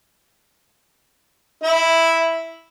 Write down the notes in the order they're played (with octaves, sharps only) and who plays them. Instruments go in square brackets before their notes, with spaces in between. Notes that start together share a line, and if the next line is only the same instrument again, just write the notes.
[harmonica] E4